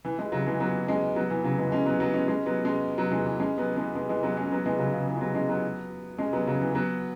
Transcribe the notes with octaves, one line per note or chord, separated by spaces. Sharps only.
E3
E3 G#3
C#3 F#3
E3 G#3
F#3 B3
G#3 C#4
F#3 B3
E3
C#3 F#3
E3 G#3
G#3 C#4
F#3 B3
F#3 B3
G#3 C#4
G#3 C#4
F#3 B3
G#3 C#4
F#3 B3
E3 G#3
E3
G#3 C#4
F#3 B3
E3 G#3
E3 G#3
E3 G#3
F#3 B3
G#3 C#4
F#3 B3
E3 G#3
C#3 F#3
C#3
E3
G#3
F#3 B3
G#3 C#4
F#3 B3
G#3 C#4
F#3 B3
C#3 F#3
E3
F#3 B3